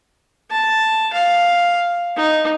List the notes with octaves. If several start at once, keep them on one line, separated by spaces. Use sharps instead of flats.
A5
F5
D#4